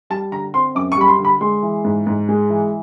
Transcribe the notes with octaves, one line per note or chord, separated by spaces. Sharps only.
G3 A5
D3 A#5
C4 C6
F#2 D6
C#6
G3 B5
C6
D3
B5
G#3 C6
E3
G#2
G#2
G#3
E3